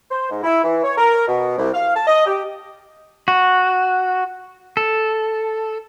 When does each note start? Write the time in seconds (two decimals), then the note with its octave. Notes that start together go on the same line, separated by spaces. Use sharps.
0.11 C5
0.30 G#2
0.43 E4
0.64 E3
0.84 C#5
0.98 A#4
1.28 B2
1.58 C2
1.74 F5
1.96 A5
2.07 D#5
2.26 G4
3.28 F#4
4.77 A4